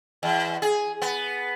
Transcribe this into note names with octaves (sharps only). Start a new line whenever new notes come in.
E2
G#4
B3